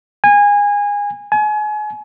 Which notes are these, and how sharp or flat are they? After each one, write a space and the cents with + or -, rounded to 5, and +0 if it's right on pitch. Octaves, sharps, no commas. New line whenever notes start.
G#5 -25
G#5 +30